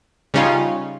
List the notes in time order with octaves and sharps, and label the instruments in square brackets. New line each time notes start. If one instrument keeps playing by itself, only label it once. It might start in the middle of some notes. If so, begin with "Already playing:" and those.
[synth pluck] C#3 G3 C#4 D#4 F4